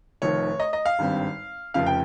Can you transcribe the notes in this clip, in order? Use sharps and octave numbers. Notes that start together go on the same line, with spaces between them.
F1 F2 D#3 C#5
D#5
D#5
F5
G#1 G2 G3 C4
F1 F2 C#3 F5
G5